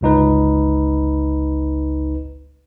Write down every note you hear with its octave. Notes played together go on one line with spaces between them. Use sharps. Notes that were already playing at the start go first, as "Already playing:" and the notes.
G1 C#2 D#4 B4